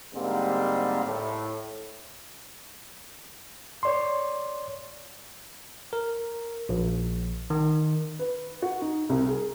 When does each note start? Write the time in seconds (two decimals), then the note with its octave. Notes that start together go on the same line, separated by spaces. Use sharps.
0.14 G#2 D3 G3 A#3 C4
1.03 A2
3.83 C#5 D5 C6
5.93 A#4
6.69 A#1
7.50 D#3
8.19 B4
8.62 F#4
8.82 D#4
9.09 C2
9.27 G#4